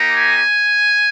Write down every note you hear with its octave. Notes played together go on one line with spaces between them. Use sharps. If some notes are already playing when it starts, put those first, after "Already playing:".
Already playing: A#3 D#4 G4
G#5